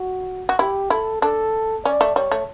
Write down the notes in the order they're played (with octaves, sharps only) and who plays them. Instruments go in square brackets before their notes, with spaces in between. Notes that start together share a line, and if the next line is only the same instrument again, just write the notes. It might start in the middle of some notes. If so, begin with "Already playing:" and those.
Already playing: [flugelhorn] F#4
[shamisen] F#4
[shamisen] E4 [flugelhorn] G4
[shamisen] E4 [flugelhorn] A4
[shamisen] D4 [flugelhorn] A4
[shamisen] C#4 [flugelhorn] D5
[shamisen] A3
[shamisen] G3 [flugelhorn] C#5
[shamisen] A3